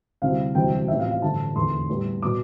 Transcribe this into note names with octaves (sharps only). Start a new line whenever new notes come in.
D2 C3 G3 C4 E4 F5
E1 D2 C3 E3 G3 G5
A1 A2 F3 C4 E5
F5
F5
A1 G2 D3 F3 A5
F1 E2 D3 A3 C6
A2 G3 B3
B2 D6